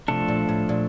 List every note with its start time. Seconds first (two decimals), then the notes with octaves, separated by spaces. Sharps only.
0.08 C3 F3 A3 D4 A4
0.28 A#2
0.49 A2
0.69 A#2